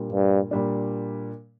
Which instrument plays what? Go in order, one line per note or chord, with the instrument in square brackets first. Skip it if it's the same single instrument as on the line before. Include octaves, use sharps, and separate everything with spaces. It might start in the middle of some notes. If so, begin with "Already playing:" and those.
Already playing: [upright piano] A#2 G3 D4
[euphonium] G2
[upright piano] A#2 G3 D4